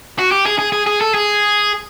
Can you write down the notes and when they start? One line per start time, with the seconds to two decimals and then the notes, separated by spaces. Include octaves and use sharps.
0.19 F#4
0.32 G4
0.46 G#4
0.59 G#4
0.72 G#4
0.86 G#4
1.01 A4
1.14 G#4